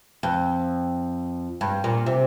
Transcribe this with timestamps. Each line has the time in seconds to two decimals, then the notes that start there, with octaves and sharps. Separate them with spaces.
0.23 F2
1.61 G2
1.84 A#2
2.06 C3